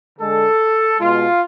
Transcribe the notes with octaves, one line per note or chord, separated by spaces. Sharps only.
D3 G#3 A4
B2 G#3 F4